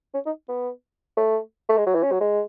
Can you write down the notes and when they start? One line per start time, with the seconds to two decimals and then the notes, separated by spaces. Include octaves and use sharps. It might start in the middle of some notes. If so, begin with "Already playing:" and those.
0.14 C#4
0.26 D#4
0.49 B3
1.17 A3
1.69 A3
1.78 G#3
1.86 F#3
1.95 E3
2.03 C#4
2.12 F#3
2.21 G#3